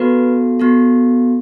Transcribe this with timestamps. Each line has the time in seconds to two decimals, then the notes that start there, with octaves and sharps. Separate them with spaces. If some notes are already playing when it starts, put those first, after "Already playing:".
Already playing: B3 F#4 A4 B4
0.60 B3 F#4 A4